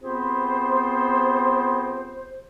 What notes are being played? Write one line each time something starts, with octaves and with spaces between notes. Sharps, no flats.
B3 C4 F4 G4 G#4 C5